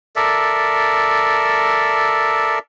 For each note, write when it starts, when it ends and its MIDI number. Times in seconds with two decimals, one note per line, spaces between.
0.16 2.59 69
0.16 2.59 70
0.16 2.59 74
0.16 2.59 76